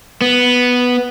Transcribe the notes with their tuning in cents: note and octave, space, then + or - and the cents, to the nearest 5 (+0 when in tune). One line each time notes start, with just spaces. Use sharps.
B3 +0